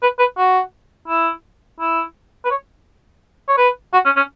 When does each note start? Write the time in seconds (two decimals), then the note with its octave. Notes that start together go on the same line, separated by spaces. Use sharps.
0.02 B4
0.19 B4
0.38 F#4
1.08 E4
1.80 E4
2.45 B4
2.50 C#5
3.48 C#5
3.57 B4
3.93 F#4
4.05 C#4
4.16 C#4